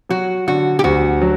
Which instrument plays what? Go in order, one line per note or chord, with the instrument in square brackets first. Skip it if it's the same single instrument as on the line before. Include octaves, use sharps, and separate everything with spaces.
[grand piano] F#3 [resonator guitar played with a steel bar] F#4
[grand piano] D3 [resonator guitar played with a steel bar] F#4
[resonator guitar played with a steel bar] G4
[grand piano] D2 [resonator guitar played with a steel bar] F#4
[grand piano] F#3